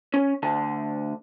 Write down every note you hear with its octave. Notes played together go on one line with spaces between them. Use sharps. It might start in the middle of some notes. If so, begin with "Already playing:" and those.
C#4
D2 D3 A5